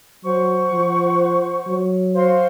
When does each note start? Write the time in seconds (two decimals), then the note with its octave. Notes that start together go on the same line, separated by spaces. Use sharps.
0.24 F#3 C5 F#5 C#6
0.72 F3
1.67 F#3
2.14 F#4 C5 F5 C6